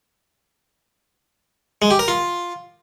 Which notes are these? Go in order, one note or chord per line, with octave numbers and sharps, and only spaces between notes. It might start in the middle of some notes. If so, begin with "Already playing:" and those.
G#3
G4
A#4
F4